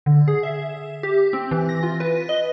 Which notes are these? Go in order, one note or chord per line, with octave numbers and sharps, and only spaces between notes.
D3
G#4
E5
G4
C4
E3
A#6
F4
B4
D#5